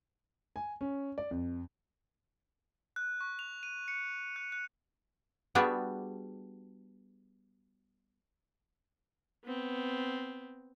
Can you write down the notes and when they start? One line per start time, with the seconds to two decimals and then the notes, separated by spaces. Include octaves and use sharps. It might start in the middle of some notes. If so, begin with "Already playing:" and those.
0.56 G#5
0.81 C#4
1.18 D5
1.31 F2
2.96 F#6
3.21 C#6
3.39 F7
3.63 D#7
3.88 C#7
4.36 F#6
4.52 F#6
5.55 G3 B3 D4 F#4 G#4
9.45 B3 C4